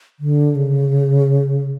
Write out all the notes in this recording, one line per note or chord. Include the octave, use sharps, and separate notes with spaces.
D3
C#3